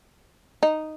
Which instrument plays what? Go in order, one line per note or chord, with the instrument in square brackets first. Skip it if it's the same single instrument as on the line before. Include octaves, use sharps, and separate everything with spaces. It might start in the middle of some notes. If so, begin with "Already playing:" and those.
[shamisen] D#4